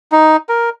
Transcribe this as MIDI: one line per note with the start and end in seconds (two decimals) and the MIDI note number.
0.12 0.36 63
0.49 0.70 70